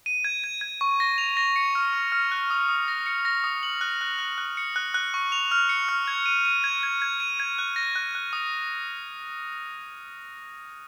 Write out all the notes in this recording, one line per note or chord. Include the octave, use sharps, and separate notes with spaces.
D#7
G#6
G#6
G#6
C#6
A#6
F7
A#6
C#7
F6
F6
F6
F#6
D#6
D#6
A#6
C#7
A#6
D#6
F#7
F#6
F#6
F#6
F#6
C#7
F#6
F#6
C#6
F7
F6
C#7
F6
G#6
D#7
D#7
G#6
G#6
G#6
D#7
G#6
F#6
A#6
F#6
F#6
D#6